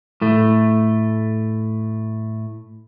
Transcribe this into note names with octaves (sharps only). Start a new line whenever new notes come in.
A2 A3